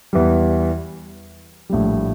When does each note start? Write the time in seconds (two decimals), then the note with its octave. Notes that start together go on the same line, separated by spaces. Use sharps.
0.13 E2 E3 G3
1.69 A#1 A2 G3